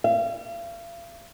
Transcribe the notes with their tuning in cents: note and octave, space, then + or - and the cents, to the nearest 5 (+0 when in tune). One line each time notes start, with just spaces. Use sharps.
F5 -40